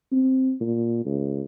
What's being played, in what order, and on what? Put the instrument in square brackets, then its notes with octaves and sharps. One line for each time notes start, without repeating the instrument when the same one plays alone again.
[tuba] C4
A#2
C#2